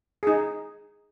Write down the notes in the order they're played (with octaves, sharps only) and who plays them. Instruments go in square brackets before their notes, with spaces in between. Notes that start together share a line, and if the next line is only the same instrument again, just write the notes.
[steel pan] D#4 G#4